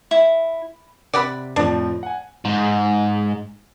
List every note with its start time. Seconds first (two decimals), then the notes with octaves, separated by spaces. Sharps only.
0.11 E4
1.14 C3 D5 F#5 B5
1.56 F2 A2 F3 D4
2.03 F#5 G#5
2.45 G#2